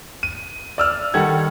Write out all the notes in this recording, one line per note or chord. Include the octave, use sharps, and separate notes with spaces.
D#7
D5 E6 F6
D#3 G3 A4 F#5 G#6